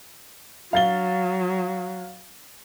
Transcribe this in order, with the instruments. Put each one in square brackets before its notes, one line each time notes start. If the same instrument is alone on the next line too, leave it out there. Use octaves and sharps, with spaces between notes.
[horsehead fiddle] F#3 [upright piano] F5 A6 G7